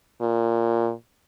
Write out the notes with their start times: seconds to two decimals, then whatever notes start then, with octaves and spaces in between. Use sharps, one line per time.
0.21 A#2